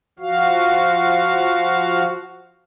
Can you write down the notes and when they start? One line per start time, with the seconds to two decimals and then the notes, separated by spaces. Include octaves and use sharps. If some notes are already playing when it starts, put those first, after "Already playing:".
0.19 F3 F#4 F5